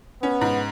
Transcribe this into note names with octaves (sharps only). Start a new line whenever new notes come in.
B3 C#4
G#2